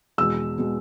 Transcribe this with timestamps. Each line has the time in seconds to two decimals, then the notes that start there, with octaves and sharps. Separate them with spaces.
0.18 E2 B2 G#3 E6
0.58 B2 G#3